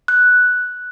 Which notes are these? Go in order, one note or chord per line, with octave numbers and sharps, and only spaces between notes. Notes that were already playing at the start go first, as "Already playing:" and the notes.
F#6